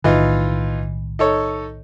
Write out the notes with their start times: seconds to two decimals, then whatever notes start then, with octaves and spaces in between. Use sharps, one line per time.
0.04 B1 A2 D#3 E3 D#4 F4
1.19 D#4 A4 C#5